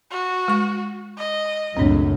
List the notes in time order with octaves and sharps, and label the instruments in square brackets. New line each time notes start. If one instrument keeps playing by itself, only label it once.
[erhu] F#4
[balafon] G#3 C#6
[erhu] D#5
[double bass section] C#2 F#2 A2 [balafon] C4 D4